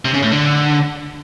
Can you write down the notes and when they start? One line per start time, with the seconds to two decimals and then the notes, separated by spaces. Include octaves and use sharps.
0.05 C3
0.14 C#3
0.23 A2
0.32 D3